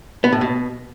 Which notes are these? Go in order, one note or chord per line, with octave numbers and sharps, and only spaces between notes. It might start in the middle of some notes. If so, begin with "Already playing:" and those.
B3
A2
B2